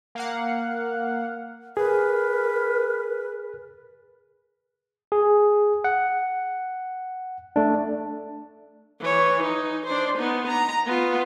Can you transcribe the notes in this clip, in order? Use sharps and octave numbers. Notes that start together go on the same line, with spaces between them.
A#3 F5 F#5
G#4 A#4 B4
G#4
F#5
A3 D4
E3 C#5
D#4
D4 C5
B3 D#4
A#5
B3 F4